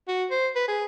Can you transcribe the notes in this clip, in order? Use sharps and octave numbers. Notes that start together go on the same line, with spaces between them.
F#4
C5
B4
G#4